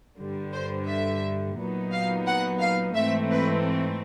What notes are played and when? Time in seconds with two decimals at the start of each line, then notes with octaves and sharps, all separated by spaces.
0.18 G2 D3 G3
0.53 C5
0.87 E5
1.57 A#2 F#3 B3 D#4
1.92 F5
2.27 F#5
2.60 F5
2.95 G#2 E3 A3 C4 E5
3.30 B4